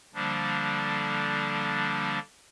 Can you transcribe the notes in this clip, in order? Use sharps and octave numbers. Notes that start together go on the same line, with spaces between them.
D3 F3 G3 A#3 D4